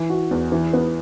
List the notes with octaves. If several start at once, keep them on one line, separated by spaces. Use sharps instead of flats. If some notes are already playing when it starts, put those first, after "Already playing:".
Already playing: E3
F#4
E2
E3
B3